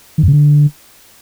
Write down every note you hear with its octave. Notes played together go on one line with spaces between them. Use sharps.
D#3
F#2
C#3
D3